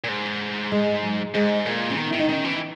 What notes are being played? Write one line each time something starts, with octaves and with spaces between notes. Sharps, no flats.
A#2
G#2
G#3
F#3
G#2 G#3
A#2 A#3
E3 C#4
D#3 B3
D#3 E4
D#4
D#3 C#4
E3